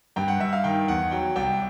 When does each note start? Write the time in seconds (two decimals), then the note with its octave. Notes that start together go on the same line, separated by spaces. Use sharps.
0.16 G2 G5
0.28 F#5
0.40 G2 E5
0.53 F5
0.64 D#3 G5
0.88 E2 F#5
1.11 F#3 G5
1.36 C2 G5